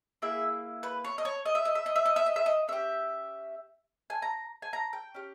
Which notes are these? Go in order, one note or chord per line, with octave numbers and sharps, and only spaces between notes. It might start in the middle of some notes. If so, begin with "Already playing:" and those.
A#3 E4 G#4 E5
B4
C#5
D#5
C#5
D#5
E5
D#5
E5
D#5
E5
D#5
E5
D#5
E5
D#5
C#4 G4 E5
G#5
A#5
G#5
A#5
G5
C#4 G4